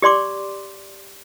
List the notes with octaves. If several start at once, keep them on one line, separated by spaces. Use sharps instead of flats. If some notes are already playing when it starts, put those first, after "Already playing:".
G4 D5 C6 D6